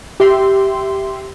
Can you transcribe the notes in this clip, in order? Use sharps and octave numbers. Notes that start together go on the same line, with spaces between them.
G4 E5 C6